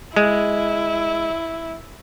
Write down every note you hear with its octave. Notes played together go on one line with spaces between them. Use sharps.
G#3 E4